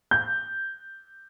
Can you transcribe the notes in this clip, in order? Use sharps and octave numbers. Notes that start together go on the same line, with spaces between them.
G6